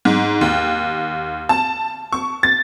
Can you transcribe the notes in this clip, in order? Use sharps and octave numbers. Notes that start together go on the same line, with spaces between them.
G#2
D#2
A5
C#6
A6